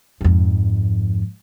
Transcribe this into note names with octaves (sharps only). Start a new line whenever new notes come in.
F2 G#2